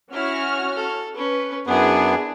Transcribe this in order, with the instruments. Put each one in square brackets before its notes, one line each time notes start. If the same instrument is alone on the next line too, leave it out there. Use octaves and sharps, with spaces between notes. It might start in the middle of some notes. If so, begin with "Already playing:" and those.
[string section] C#4 F#4 F6 [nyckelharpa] E4
[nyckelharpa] A4
[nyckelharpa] C#4 [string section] B4
[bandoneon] F#2 B3 [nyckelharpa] D4 [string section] E4 G#4 B4